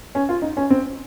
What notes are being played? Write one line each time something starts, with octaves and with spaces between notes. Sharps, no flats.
C#4
F4
D#4
C#4
C4